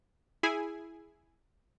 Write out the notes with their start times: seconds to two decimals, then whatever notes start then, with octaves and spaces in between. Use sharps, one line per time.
0.43 E4 G#4 G#5